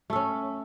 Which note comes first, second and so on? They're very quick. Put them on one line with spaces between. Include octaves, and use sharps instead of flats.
A3 A4 C#4